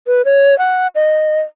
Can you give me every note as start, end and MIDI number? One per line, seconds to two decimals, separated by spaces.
0.07 0.22 71
0.25 0.57 73
0.58 0.87 78
0.95 1.41 75